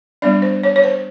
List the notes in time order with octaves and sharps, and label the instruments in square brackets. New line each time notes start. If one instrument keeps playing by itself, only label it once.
[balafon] G3 B3 D4 D5
C5
C#5
C#5
C5